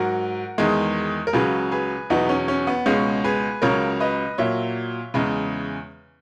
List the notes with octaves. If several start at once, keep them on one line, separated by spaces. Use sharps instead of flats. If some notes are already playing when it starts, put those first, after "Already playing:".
Already playing: G#2 F#3 F#4 A#4
E2 D#3 G#3
A#4
C#2 C#3 F#3 G#4 B4
G#4 B4
E2 B2 F#3 B3 D#4
C#4
C#4
B3
C#2 B2 G#3 C#4
G#4 B4
C#2 C#3 F#3 A#4 C#5
B4 D#5
A#2 F#3 C#5 E5
E2 C#3 G#3